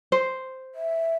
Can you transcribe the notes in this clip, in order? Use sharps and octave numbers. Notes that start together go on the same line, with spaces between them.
C5
E5